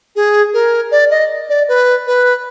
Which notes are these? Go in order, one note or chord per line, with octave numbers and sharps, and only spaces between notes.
G#4
A#4
D5
D#5
D5
B4
B4